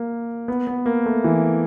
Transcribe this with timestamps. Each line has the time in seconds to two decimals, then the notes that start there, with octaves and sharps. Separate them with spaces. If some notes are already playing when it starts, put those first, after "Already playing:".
Already playing: A#3
0.48 B3
0.67 B3
0.86 A#3
1.06 A3
1.24 E3